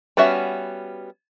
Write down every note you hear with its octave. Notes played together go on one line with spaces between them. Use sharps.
G3 B3 C#4 F#4 E5